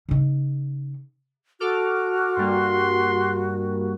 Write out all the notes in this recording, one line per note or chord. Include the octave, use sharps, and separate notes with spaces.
C#3 D#4
F#4 A4 D6 F6
G2 G3 A#3 C6